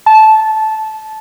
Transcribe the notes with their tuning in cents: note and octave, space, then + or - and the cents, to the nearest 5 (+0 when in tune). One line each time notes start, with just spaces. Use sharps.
A5 -15